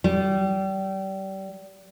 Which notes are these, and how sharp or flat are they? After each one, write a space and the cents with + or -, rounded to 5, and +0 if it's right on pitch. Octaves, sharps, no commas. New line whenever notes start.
G3 -30